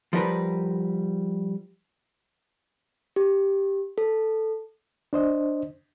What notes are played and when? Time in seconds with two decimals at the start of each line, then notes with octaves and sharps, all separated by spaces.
0.13 F3 G3 A#4 B4
3.16 G4
3.98 A4
5.13 D4 C5 D#5